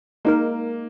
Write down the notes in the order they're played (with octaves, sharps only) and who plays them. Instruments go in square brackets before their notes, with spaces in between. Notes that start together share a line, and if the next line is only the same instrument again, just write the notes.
[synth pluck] G#3 D#4 A#4 [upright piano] A#3